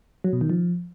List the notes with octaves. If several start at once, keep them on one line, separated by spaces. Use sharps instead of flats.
F#3
B2
D#3
F3